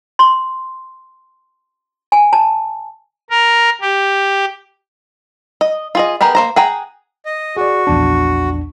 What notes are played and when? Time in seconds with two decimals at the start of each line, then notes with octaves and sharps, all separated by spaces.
0.19 C6
2.12 G#5
2.33 A5
3.30 A#4
3.81 G4
5.61 D#5
5.95 F4 G#4 D#5
6.21 B3 G4 G#4 A#4
6.35 A#3 C5 A#5
6.56 G#4 F#5 G5 A#5
7.26 D#5
7.57 F#4 G#4 D5
7.87 A#1 E2 D4